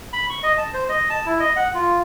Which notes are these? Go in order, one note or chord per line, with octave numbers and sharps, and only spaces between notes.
B5
C#6
D#5
A5
C5
D#5
A5
E4
D#5
F#5
F4